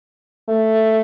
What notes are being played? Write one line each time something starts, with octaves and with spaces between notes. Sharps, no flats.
A3